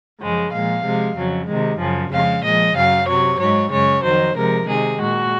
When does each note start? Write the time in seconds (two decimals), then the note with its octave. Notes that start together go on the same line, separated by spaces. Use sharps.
0.19 F#2 C#3 F3 G#3
0.51 A#2 F3 G#3 F5
0.83 C3 F3 G#3
1.15 F2 C#3 F#3
1.47 C3 D#3 G#3
1.79 F#2 C#3 F3
2.10 F2 C#3 G#3 F5
2.42 A#2 F3 G#3 D#5
2.75 F#2 C#3 F#3 F5
3.06 C3 F#3 C#5
3.38 G#2 F#3 C#5
3.70 F#2 C#3 G#3 C#5
4.02 F2 D#3 F#3 C5
4.34 C3 F3 G#3 A#4
4.66 C3 D#3 G#3 G#4
4.98 A#2 G#3 F#4